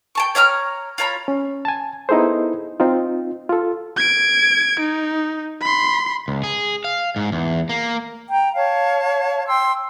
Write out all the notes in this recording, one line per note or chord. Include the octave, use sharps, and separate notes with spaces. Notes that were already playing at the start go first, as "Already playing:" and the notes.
G5 A5 C#6
C#5 E5 A#5 F6
F4 C#5 A#5 B5
C#4
G#5 A5
B3 D#4 E4 G#4 A4 C5
C4 D#4 F4
F4 A4
G#6 D7
D#4
B5 C6
C#2
G#4
F5
G#2
E2
A#3
G5 A#5
C#5 F5 A5
G5 C6 E6